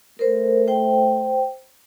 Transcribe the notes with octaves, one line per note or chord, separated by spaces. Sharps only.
A3 A#4 C5
C5 G5